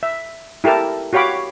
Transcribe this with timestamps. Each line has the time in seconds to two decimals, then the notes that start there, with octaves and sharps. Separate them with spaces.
0.03 E5
0.64 E4 G4 A4 A#4 A5
1.13 F#4 G4 C#5 F5 B5 D6